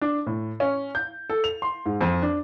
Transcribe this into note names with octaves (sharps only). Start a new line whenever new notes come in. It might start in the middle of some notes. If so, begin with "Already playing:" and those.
D4
A2
C#4
G6
A4
F7
C6
G#2
F2
D4